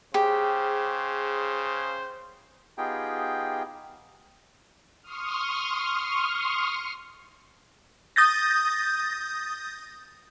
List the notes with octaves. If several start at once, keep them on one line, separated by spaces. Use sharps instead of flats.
C#3 G4 G#4 C5
B3 D#4 F4 G4 G#4 G5
C6 C#6 D#6 F6
D#6 G6 A6 A#6